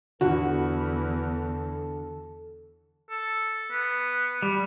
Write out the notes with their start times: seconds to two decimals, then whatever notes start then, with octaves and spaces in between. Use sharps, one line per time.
0.21 E2 D3 F#4 A4
3.10 A4
3.71 B3
4.42 G3